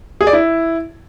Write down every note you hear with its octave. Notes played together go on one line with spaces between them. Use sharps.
G#4
D5
E4